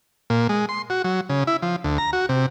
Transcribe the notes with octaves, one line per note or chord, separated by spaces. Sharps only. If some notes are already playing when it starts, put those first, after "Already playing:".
A#2
G#3
C6
F#4
F#3
C#3
E4
F3
D2
A#5
F#4
C3